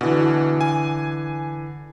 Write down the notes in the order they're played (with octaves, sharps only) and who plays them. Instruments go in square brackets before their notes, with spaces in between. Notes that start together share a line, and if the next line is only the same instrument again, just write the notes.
[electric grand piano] B2 [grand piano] D3 E3
[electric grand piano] G#5